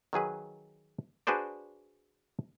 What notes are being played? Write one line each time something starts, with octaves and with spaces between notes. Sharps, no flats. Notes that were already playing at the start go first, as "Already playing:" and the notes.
D#3 F#3 G#4 B4
D4 F#4 G#4 B4 C5 D5